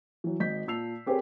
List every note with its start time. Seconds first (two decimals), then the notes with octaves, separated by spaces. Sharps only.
0.24 E3 F#3
0.40 G#1 D#5 G6 B6
0.67 A#2 A5 E6 C7 F7
1.06 C4 G4 G#4 A#4 B4 C#5